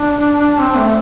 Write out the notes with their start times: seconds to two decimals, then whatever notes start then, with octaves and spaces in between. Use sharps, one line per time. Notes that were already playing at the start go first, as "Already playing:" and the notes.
Already playing: D4
0.60 C4
0.77 A3